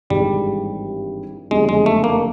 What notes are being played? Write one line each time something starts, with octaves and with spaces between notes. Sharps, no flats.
G#1 G2 E3 G3 G#3
F#1 F2 D3 G3 G#3 B3
G#3
A3
A#3